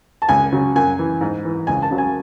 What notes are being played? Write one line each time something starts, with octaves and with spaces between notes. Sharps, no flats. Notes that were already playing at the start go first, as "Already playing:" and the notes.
A5
C#2 G#5
C#3 F#3
F#2 G#5
E3
G#2
E3
C#2 G#5
A5
C#3 F#3
G#5